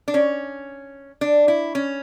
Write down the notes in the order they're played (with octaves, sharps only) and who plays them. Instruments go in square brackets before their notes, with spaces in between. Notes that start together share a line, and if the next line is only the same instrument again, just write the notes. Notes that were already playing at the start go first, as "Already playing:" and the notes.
[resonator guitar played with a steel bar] D4
C#4
D4
E4
C#4